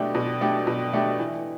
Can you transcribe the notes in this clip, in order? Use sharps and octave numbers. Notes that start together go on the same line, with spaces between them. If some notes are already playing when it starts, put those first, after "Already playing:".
Already playing: B2 A3 D4 G4
B2
A3 D4 G4
B2
A3 D4 G4
E3